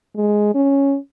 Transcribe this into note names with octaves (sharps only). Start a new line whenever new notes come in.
G#3
C#4